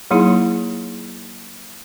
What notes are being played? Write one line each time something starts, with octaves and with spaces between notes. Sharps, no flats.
F#3 A#3 D#4 E4 G#4